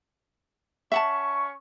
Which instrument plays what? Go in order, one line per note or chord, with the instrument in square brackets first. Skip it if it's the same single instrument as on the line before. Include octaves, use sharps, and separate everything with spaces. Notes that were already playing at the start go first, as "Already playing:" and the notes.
[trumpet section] C#4 C#6 [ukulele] E5 F#5 A5